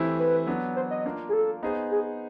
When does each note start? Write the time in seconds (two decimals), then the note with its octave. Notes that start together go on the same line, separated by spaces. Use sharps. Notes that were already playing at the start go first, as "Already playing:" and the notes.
Already playing: E3 A3 C4 E4 G4
0.19 B4
0.47 F#3 B3 D4
0.76 C5
0.90 D#5
1.05 A#3 D4 F4
1.29 G#4
1.33 A4
1.63 B3 D#4 G#4 C5
1.91 G#4